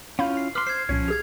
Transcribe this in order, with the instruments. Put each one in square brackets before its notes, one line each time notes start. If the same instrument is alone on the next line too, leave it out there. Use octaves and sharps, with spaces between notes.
[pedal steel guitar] C#4 E4 F4 [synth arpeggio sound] F5 B5 G6
[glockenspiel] C7
[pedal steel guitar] B4 C6 [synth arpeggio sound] D6 [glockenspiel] F6
[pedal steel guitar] C5 [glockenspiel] G#6 C7
[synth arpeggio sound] C2 A#2 [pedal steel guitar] F3 C#4 C#5
[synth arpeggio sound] G4 G#4 [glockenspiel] G#6 F7